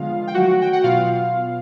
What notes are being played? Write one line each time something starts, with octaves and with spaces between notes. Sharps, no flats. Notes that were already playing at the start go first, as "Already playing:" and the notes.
Already playing: D3 F3 G#3 B3 F4 F5
G5
D#3 F#3 A3 F#4 F#5
G5
F#5
B2 F#3 B3 F4 F5